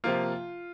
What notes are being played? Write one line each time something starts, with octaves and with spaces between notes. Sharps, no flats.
C3 F3 A#3 F4